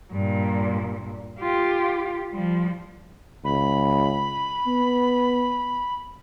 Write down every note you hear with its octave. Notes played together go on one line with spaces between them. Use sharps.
G2 A#2
F4 G4
F3 G3
C#2 B5
B3